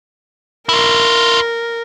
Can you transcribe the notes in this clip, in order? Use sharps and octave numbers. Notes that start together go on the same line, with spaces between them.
E4 F4 A#4